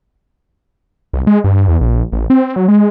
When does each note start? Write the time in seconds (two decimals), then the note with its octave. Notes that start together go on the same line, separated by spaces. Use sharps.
1.13 C2
1.27 G#3
1.44 G2
1.68 E2
1.81 A#1
2.13 A1
2.30 C4
2.56 F#3
2.68 G#3